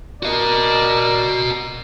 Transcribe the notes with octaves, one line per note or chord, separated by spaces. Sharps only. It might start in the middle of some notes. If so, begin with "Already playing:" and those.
F#4 A#4 D5 D#5